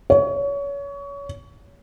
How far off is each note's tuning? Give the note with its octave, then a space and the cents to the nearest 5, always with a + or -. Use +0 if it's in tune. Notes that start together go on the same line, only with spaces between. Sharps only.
C#5 +25